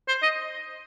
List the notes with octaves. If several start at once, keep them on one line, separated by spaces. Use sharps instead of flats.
C5
D#5